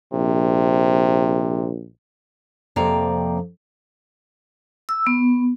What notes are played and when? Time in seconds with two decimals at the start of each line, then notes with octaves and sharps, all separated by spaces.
0.13 A#1 C3
2.76 F2 C3 A#3 C4 D5 A#5
4.89 E6
5.07 B3